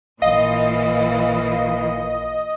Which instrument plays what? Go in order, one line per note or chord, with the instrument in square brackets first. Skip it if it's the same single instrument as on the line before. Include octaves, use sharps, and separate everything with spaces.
[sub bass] A1 [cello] A#2 E3 [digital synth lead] D#5 [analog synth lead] F5